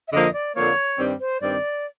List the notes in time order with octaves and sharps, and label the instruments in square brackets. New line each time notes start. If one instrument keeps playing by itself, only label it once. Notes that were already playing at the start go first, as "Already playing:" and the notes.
[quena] E5
[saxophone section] F2 D3 F3 A#3 [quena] D#5
[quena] D5
[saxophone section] F2 D3 F3 A#3 [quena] C#5
[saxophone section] G2 D#3 G3 C4
[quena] C5
[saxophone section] G2 D#3 G3 C4 [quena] D5